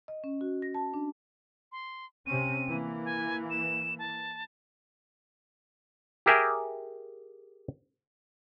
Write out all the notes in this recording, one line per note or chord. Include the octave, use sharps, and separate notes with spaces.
D#5
C#4
F#4
A#6
A5
D4
C6
C3 C4 C#4 D#7
E3 A#3
G#5
E7
A5
G4 G#4 A#4 E5 G5 G#5